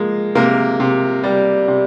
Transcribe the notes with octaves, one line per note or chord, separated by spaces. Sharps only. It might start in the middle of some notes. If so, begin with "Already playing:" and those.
Already playing: F3 G#3 A#3
C3 A#3 A#4
C3
G3
C3